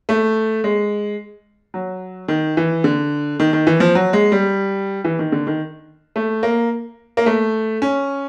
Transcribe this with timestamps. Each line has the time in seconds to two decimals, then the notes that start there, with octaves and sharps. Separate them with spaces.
0.09 A3
0.64 G#3
1.74 F#3
2.28 D#3
2.57 E3
2.84 D3
3.40 D#3
3.53 D#3
3.67 E3
3.80 F3
3.95 F#3
4.13 G#3
4.32 G3
5.04 E3
5.19 D#3
5.32 D3
5.47 D#3
6.16 A3
6.43 A#3
7.17 A#3
7.26 A3
7.82 C#4